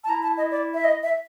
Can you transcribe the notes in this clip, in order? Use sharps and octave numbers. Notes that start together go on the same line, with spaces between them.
A5
E4 A#5
A5
D#5
D5
E5
D#5
E5